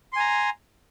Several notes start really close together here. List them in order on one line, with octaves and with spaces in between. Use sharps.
C6 G#5 A#5